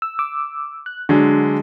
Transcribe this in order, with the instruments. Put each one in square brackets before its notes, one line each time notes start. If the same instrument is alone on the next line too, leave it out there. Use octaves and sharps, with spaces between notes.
[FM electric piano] E6
D6 E6
F#6
[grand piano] D3 F#3 G#3 [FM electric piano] D4